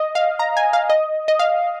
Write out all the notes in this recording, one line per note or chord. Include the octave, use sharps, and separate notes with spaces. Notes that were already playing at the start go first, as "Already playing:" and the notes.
Already playing: D#5
F5
A#5
G#5
F5
D#5
D#5
F5